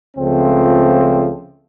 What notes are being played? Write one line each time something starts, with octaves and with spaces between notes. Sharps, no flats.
C#2 C#3 F3 A3 C4